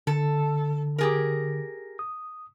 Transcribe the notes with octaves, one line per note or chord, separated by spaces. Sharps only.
D3 A4
G4 G#4 A#4
D#6